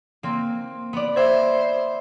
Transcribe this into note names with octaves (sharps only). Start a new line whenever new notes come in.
A#3 C4
B3 D5
C5 E5 G#6